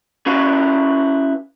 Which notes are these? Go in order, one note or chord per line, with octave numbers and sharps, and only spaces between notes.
C#4 E4 F#4 B4 F5